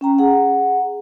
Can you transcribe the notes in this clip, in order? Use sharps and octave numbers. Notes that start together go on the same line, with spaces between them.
C#4 G5 A#5
G#4 F#5